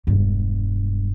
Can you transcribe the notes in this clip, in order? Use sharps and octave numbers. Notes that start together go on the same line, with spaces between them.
E1 G2